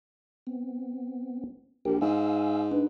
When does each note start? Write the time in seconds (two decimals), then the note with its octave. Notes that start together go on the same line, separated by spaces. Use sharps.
0.47 B3 C4
1.85 A#1 G4 A#4 G5
2.01 G#2 F5 G#5 E6
2.71 D4 D#4 B4